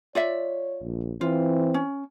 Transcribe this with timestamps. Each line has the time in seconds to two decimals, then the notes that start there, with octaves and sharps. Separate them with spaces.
0.15 F4 C#5 D5 E5
0.82 A#1
1.21 E3 C4 F4
1.74 C#4